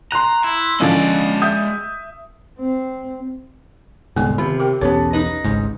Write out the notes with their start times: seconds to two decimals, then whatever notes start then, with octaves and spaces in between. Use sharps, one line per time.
0.12 A#5 C6 F#6
0.44 E4
0.80 D3 F3 G#3 C#4 D5
1.42 E5 D#6 G6
2.59 C4
4.16 D#1 C2 G#2 D3 B3
4.38 C3 D#3 F4
4.60 G4 A#4 G5
4.81 B1 E2 B3 C#4 G4 A4 C#5
5.13 D#4 B4 D#5
5.44 G#1 C#2 G#2